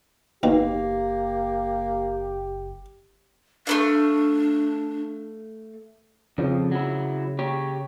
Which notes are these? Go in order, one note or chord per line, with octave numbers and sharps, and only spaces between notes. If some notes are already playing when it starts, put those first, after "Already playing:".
F#1 D#2 B2 D#3 A#3 G4
A3 B3 D4 F5
F2 C#3 F3
F#3 E4
G4 C#5